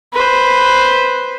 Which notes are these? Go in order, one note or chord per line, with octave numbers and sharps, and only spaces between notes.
B4 C5